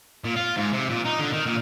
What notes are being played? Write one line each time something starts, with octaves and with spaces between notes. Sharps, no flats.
A#2
F4
G#2
C3
A#2
D#4
D3
D#3
A#2